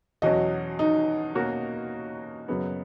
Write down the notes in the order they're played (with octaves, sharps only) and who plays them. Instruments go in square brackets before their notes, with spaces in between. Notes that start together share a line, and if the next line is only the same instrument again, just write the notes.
[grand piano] E2 B2 F#3 C#4 [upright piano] D#5
[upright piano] D#4
[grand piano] B2 A#3 C#4 F#4 A#4
F#2 C#3 F#3 B3